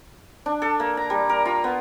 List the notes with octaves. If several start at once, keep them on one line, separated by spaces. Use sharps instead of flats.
D4
A4
A#3
A#5
G3
A#4
F4
B3